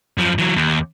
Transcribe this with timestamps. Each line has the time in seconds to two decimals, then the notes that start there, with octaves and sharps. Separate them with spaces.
0.17 F#2 F3
0.39 E3 F#3
0.56 D#2